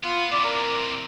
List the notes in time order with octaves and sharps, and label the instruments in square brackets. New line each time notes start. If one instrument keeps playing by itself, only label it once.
[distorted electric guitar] B3 [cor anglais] F4
[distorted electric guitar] C3 E3 [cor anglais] D5
[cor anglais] A#4